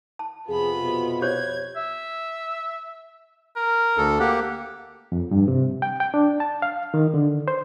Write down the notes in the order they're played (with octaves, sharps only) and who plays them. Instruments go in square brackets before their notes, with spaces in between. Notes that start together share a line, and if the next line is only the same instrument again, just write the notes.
[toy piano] A5
[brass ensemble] F2 C3 F4 [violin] B3 B5 [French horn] G#4
[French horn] B2
[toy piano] G4 C5 C#5 [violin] G#6
[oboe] E5
A#4
[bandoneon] D2 A4
[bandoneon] A#3 G4 [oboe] F#5
[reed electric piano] F2
G2
C3
G5
G5
D4
A5
F5
D#3
D3
C5